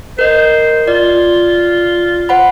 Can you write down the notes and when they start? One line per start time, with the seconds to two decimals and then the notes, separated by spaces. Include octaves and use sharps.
0.19 A#4 C5 D#5
0.88 F4 D5
2.29 C5 F#5 B5